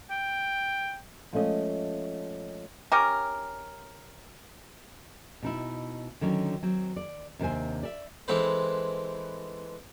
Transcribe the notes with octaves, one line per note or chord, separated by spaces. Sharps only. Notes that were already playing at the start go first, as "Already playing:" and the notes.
G5
F3 G#3 A3 C#4 D#5
C#4 G4 A#4
B2 D#4 E4
D3 D#3 F#3 C#4
F#3 C4
D5
D#2 C3 D4 C5 G#5
D5 E5
E3 G#3 C4 A4 B4 C5